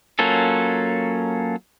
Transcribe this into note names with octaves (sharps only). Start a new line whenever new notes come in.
F#3 A#3 C#4 F4 A4